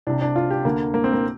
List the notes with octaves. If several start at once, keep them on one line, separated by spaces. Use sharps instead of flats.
C2 C3 D4
D4
F4
G4
D2 D3 A#3
A#3
C4
A#3